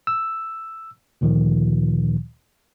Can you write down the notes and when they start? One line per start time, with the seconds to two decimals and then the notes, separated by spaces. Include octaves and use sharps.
0.07 E6
1.21 D2 A#2 D#3 F3